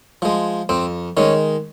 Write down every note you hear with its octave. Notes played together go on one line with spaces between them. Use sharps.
F3 G#3
F2 C4
D#3 G#3 C#4